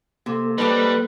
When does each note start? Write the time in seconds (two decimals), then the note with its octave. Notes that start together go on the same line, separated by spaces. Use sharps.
0.26 C3 A#3 A4
0.58 G3 C4 D4 D#4 B4